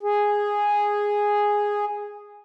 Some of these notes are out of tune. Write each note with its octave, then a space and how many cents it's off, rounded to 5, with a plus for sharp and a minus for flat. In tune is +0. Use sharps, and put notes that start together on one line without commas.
G#4 -5